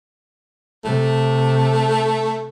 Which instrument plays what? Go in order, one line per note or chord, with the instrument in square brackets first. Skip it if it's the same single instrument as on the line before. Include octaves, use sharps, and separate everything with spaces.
[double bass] C3 [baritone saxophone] A3